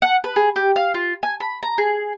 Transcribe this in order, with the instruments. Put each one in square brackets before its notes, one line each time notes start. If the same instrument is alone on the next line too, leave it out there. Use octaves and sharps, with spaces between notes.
[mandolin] F#5
B4
G#4
G4
F5
F4
G#5
B5
A#5
G#4